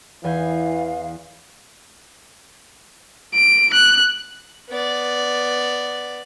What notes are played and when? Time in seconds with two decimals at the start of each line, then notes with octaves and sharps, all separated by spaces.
0.24 E2 E3 F5 G#5 G6
3.34 D7
3.73 F#6
4.69 B3 D5